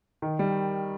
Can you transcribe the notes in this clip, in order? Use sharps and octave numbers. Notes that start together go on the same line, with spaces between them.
D#3
G3